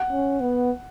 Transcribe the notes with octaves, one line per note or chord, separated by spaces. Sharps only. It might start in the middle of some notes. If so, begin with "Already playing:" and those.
Already playing: F#5
C#4
B3